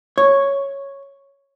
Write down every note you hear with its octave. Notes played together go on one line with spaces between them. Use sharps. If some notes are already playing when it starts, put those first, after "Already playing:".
C#5